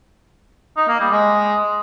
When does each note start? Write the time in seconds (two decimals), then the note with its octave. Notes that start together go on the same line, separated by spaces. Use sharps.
0.76 D#4
0.88 A#3
1.00 G3
1.11 G#3